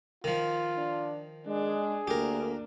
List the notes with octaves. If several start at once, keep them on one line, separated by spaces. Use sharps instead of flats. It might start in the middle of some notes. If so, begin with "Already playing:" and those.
D#3 F3 F4
D4
G#3 D4 G#4
D2 A#3 D4 G4 A#4